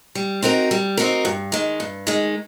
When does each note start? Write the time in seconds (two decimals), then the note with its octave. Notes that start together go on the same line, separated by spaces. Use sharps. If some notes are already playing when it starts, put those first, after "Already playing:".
0.15 G3
0.43 C4 D#4 F#4 A#4
0.71 G3
0.97 C4 D#4 F#4 A#4
1.25 G2
1.52 D#3 G#3
1.80 G2
2.07 D#3 G#3